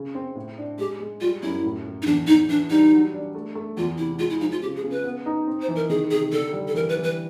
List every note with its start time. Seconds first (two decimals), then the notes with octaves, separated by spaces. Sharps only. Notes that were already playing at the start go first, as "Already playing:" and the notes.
Already playing: C#3
0.15 C4
0.36 A2
0.58 D4
0.79 G#3 G4
1.00 G#3
1.21 G3 F4
1.42 F#2 E4
1.64 A2
1.85 A2
2.02 D#4
2.06 E2 D4
2.27 E2 D#4
2.49 E3 D4
2.70 G3 D#4
2.92 F#3
3.13 D4
3.35 A3
3.55 A3
3.77 E2 F4
3.98 C3 E4
4.19 G#3 F4
4.30 E4
4.40 F3 D#4
4.51 F4
4.62 C#3 G4
4.76 G#4
4.84 C#3
4.90 B4
5.04 B3
5.26 D#4
5.47 C4
5.62 C5
5.68 E3
5.76 A#4
5.90 D#3 G#4
6.11 C3 G#4
6.32 D3 A4
6.53 G3
6.68 A4
6.74 E3 A#4
6.89 B4
6.97 E3
7.03 B4